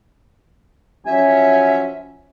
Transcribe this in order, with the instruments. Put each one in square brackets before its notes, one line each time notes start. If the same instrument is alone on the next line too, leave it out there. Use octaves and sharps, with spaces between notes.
[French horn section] F3 F#3 C#4 [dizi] E5 [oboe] G#5